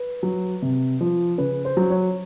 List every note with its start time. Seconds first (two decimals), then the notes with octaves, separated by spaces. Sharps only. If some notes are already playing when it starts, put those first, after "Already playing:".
Already playing: B4
0.23 F#3
0.62 C3
1.01 F3
1.38 C#3 B4
1.65 C5
1.77 F#3
1.90 C#5